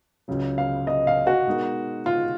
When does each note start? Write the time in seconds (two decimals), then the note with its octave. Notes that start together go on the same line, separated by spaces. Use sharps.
0.28 C#2 C#3 F#3
0.58 F5
0.87 D#5
1.07 F5
1.27 F#4
1.47 B2 G#3 D#4 A#4
2.06 F4